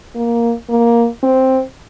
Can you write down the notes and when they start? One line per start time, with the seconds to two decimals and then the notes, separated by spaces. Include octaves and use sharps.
0.15 A#3
0.69 A#3
1.23 C4